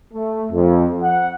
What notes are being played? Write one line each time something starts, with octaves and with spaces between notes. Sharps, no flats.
A3
F2
F#5